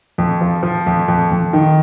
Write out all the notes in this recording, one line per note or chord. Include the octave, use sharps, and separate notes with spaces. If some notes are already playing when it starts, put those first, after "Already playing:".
F2
F3
F3
F2
F2
F2
D#3